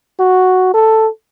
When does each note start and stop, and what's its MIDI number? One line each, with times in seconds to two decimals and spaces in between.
0.20 0.73 66
0.74 1.08 69